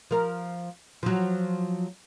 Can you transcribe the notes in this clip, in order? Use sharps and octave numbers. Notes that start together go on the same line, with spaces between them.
F3 A#4
F3 F#3